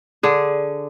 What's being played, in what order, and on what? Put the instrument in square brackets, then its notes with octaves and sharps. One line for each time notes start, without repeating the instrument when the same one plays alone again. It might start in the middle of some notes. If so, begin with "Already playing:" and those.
[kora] D3 G#4